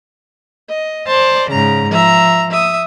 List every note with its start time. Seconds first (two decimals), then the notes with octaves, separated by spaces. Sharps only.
0.68 D#5
1.07 C5 D5 A5
1.51 G#2 C#3 A#5
1.91 F3 E5 A#5
2.51 E5 D#6